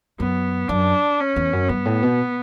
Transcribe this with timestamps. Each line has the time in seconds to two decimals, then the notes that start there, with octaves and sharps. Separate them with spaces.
0.20 F#2 B3
0.69 F#2 D4
1.20 C#4
1.36 E2
1.53 F#2
1.69 G2 B3
1.85 A2
2.03 B2